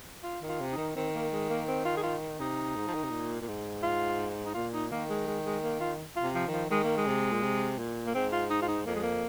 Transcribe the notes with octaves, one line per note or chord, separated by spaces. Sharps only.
F4
D#3
F4
C3
D#4
D#3
D#3 C4
A#3
G#3
A#3
C4
F4
G#4
F4
C3 D#4
G#2
F3
D#3
C3
A#2
A#2
G#2
F4
D#4
A#2 F4
D#4
D#3 A#3
G#3
G#3
G#3
A#3
F4
F4
C3
F3
D#3 F3
D#3 G#3
A#3
G#3
C3
A#2
C3
A#2
A#3
G#2 C4
F4
D#4
F4
D#4
F2 A#3
G#3
A#3